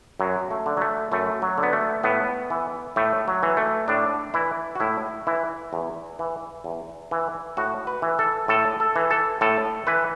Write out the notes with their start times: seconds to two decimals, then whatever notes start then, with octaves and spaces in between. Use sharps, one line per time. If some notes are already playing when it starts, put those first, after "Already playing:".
0.20 F#2 F#3
0.51 A3
0.66 D3
0.77 F#3
0.81 A3
1.12 F#2 A3
1.42 F#3
1.58 D3
1.63 B3
1.73 A3
2.04 A2 B3
2.50 E3
2.96 A2 A3
3.28 F#3
3.43 E3
3.57 A3
3.88 A2 D4
4.34 E3 E4
4.75 F#4
4.80 A2 E4
5.27 E3 E4
5.73 E2
6.19 E3
6.64 E2
7.11 E3
7.57 A2 F#4
7.87 B4
8.02 E3
8.19 A4
8.48 A2 A4
8.80 A4
8.96 E3
9.11 A4
9.41 A2 A4
9.87 E3 B4